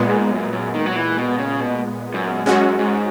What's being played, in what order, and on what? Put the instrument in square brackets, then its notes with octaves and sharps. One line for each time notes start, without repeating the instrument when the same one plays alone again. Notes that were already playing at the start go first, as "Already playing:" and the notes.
Already playing: [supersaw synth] A#2 G#3 B3
[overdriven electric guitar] G#2
F#2
F#2
D#3
F#3
E3
B2
C#3
B2
F#2
[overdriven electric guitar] F#2 [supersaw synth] G#3 C#4 F#4
[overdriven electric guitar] G#2